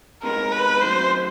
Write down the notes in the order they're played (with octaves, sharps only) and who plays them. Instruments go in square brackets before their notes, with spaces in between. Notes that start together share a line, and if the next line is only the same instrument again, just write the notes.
[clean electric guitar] C3 D#3 G#3 B3 [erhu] A#4
[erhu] B4
[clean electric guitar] F#2 D#3 F#3 A3 [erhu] C5